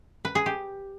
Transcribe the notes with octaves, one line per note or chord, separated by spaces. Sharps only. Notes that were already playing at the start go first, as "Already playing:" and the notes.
B4
G#4
G4